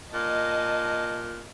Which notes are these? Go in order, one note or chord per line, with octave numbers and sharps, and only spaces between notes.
A#2 D#5 A5